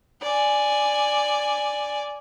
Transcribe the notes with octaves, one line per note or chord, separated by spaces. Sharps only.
D5 G#5